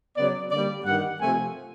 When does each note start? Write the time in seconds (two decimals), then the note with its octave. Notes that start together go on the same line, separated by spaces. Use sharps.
0.16 C#3 F#3 B3 D5
0.51 D3 G3 A#3 D5
0.86 G2 D#3 G3 F#5
1.22 C3 F3 A3 C4 G#5